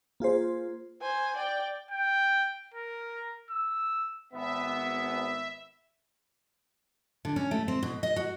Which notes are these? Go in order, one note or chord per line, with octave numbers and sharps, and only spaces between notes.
A#3 F4 G#4 C5
C5 G#5
D5 G5
G5
A#4
E6
G#1 B3 E5
D3
C#4
A3
C4
B2
D#5
F#4